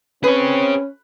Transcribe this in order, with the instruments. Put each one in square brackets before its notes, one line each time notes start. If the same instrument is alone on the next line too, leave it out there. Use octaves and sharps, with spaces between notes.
[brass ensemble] C4 [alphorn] C#4 [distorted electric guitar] G#4 C#5 [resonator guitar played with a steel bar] B4